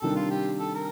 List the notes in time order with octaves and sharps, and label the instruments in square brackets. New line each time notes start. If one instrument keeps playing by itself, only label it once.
[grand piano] C3 D#3 G3 D4 [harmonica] A4
[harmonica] F4
G4
A4
A#4